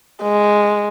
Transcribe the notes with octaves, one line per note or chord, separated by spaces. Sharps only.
G#3